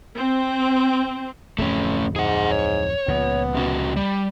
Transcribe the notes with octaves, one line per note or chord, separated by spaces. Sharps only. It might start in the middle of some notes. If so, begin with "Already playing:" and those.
C4
D1 F2 A3 C#4
G#2 G#4 F#5
C#5
C#2 A#2 F3 B3
C3 C#4 F#4
G3